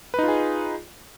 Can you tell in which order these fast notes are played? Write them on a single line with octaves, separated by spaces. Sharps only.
B4 D#4 F4 G#4